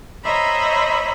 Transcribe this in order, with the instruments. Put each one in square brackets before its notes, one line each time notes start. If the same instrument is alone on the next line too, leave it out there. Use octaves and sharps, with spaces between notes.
[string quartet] C5 C#5 D#5 E5 A#5 B5